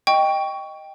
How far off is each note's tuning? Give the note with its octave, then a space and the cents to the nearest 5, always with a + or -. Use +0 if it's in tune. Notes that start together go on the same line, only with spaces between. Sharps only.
D#5 +0 G5 +0 C#6 +15